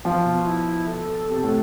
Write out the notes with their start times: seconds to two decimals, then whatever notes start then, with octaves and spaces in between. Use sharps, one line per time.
0.04 F3 F4
0.25 B2
0.46 E4
0.87 A4
1.30 C3
1.44 A2